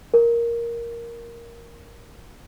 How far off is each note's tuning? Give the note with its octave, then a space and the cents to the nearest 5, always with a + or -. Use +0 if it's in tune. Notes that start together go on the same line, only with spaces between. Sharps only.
A#4 +5